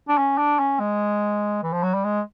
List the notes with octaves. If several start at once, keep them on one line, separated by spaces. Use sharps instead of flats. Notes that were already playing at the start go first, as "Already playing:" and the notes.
D4
C#4
D4
C#4
G#3
E3
F3
F#3
G3
G#3